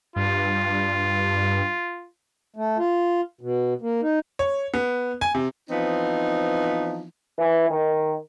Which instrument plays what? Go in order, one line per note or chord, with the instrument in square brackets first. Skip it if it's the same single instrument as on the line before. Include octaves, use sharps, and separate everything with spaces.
[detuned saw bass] G2 [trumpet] F4
[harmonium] A3
F4
B2
A#3
D#4
[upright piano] C#5
B3
G#5
C3
[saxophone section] E3 F3 B3 C4 D#4
[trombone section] E3
D#3